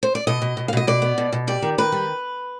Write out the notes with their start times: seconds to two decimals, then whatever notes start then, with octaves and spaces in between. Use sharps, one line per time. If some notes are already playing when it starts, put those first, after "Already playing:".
0.03 C5
0.15 D5
0.27 B2 D#5
0.42 B2
0.57 B2
0.68 F5
0.73 B2 D#5
0.87 B2 D5
1.02 B3
1.18 B2
1.33 B2
1.47 G3 D5
1.62 D#3
1.78 D#3 B4
1.92 G3